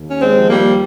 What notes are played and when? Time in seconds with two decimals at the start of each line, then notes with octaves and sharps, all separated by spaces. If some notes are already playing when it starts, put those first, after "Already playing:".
Already playing: D#2
0.10 C#4
0.21 G#3 C4
0.35 F3
0.50 G3 A#3